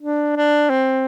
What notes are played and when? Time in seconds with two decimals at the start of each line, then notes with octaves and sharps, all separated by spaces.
0.01 D4
0.36 D4
0.70 C4